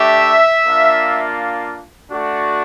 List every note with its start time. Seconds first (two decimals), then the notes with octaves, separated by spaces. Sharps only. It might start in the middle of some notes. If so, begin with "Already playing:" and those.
Already playing: A3 D4 G4 E5
0.66 A#3 D4 F4
2.12 A3 D4 F#4